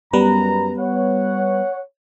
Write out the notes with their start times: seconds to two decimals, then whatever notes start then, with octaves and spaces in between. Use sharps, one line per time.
0.13 F#2 G3 B3 B4 A#5
0.79 C#5 F#5